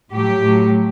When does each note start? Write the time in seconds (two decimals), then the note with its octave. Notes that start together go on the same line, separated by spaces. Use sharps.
0.11 A2 F#3 G4
0.41 A2 F#3